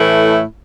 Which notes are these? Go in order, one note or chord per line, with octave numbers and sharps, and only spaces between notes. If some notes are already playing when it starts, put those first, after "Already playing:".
Already playing: A2 E3 A3 E4